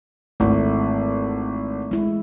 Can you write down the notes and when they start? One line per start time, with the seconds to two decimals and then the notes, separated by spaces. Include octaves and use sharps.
0.40 G#1 A3 E4
1.91 G#3 E4